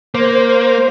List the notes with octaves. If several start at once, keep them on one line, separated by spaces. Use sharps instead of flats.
A#3 C5